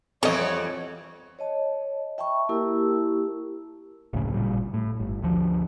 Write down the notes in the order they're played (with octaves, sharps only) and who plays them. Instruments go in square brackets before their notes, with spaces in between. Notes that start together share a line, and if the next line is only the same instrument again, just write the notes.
[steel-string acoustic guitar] F2 [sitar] E3 G3 B3 [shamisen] A4 D#5 [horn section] C#5
[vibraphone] C#5 D#5 A5
E5 G5 A5 B5 C#6
A#3 E4 G4 A#4 A5 E6
[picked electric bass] F#1 D2 A2 C#3
G#1 A#2 G3
A2
G1
D2 D3 F3